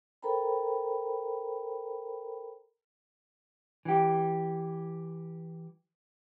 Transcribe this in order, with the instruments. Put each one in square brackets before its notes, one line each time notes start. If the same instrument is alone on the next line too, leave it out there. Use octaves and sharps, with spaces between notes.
[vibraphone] A4 A#4 C5 G5 A#5 B5
[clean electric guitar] E3 G4